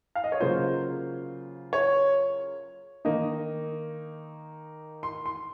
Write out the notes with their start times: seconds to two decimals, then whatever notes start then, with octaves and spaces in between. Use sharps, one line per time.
0.15 F5
0.24 D#5
0.32 C#5
0.40 C#3 F#3 A#3 F4 C5
1.73 C#5
3.05 D#3 A#3 D#4 D#5
5.03 C6
5.26 C6